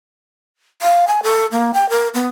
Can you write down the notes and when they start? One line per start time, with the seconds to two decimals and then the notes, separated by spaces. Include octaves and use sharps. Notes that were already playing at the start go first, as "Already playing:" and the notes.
0.82 F5
1.08 G#5
1.23 A4
1.52 A#3
1.74 G5
1.90 A#4
2.14 B3